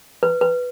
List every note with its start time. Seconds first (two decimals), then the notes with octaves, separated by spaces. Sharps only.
0.23 B4
0.41 B4